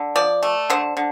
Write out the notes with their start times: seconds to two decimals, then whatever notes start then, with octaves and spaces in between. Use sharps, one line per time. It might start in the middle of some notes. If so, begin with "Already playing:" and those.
Already playing: D3
0.16 F3 D5
0.43 A3
0.70 D3 C5
0.97 D3